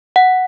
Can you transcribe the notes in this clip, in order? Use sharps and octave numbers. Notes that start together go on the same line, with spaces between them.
F#5